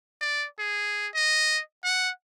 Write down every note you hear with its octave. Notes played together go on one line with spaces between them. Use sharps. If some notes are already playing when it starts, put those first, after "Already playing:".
D5
G#4
D#5
F#5